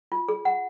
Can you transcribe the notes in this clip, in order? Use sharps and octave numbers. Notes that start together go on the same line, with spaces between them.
F4
G#4
F#5